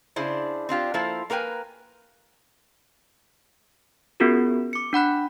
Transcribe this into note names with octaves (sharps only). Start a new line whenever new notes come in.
C#3 D4 E4 G#4 C5
C4 D4 F4 G4
F3 A#3 E4 A4 C5 F5
A#3 A#4 B4 G5 G#5
B3 C#4 F4 F#4 G#4 A#4
D6 C#7
D4 F#5 B5 F#6